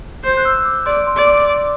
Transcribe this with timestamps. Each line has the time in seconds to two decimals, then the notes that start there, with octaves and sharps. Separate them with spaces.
0.24 C5 G6
0.37 F#6
0.45 E6
0.58 E6
0.65 D6
0.86 D5 C6
1.07 C6
1.17 D5
1.27 D6